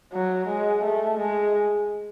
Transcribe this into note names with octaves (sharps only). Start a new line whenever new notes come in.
F#3
G#3
A3
G#3